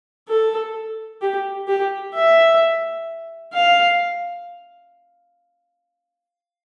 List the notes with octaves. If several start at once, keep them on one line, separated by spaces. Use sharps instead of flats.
A4
G4
G4
E5
F5